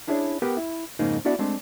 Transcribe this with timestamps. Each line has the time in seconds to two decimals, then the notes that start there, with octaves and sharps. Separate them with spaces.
0.07 C#4 D4 E4 G#4 C#5 D5
0.42 B3 G4 A#4 B4 F#5 G5
0.57 E4
0.99 F2 G#2 C#3 A#3 D#4
1.25 B3 D4 E4 F#4 D5 F#5
1.39 G#3 A3 C4 D4